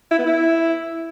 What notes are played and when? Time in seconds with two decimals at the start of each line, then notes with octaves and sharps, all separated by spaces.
0.11 E4
0.19 B3
0.26 E4